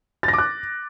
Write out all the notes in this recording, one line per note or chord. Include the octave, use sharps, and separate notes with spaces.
A6
A#6
D6
F#6